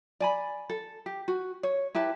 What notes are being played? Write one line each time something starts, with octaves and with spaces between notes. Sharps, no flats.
D5 G#5 B5
A4
G4
F#4
C#5
E4 G4 B4 A5